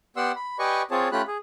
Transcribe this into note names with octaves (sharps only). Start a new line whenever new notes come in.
B3 G4 D5 F#5 C6 E6
B5
G4 B4 D5 D#5 G#5 C#6
C4 F4 G#4 C#5 A5
A3 C#4 F4 G4 B5 F#6
G#4